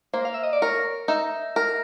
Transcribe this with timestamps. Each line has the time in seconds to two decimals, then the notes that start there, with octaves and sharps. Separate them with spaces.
0.14 A#3 C5
0.25 F5
0.34 E5
0.43 D#5
0.53 D5
0.62 A#4 C#5
1.08 D#4 E5
1.56 A#4